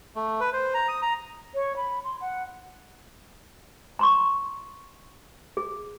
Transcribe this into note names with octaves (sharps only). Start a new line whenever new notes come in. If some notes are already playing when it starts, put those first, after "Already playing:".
A3
B4
C5
A#5
D#6
A#5
C#5
B5
C6
F#5
A#5 C6 C#6
G#4